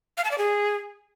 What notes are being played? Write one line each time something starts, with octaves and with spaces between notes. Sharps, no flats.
F5
A5
D5
G#4